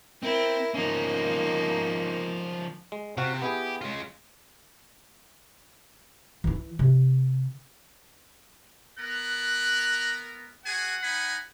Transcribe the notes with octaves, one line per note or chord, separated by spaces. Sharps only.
C4 E4 A#4
F3 A#3 C#4 D#4
G#3
C3 C4 F4 F#4
B3 E4 G4 G#4
G#3 F4
E3 E4
C3
B3 A#4 F#6
F#4 G#4 F#5 G#5
D#4 G#5 B5